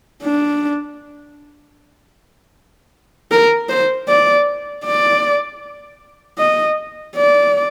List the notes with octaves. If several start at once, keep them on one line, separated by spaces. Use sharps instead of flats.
D4
A#4
C5
D5
D5
D#5
D5